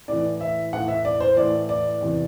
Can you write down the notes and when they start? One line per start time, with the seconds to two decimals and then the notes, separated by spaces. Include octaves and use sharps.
0.08 A2 E3 D5
0.41 E5
0.73 A2 E3 F#5
0.88 E5
1.05 D5
1.20 C5
1.36 A2 E3 D5
1.69 D5
2.01 E2 C3 E3